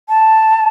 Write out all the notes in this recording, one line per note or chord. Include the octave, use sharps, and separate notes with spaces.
A5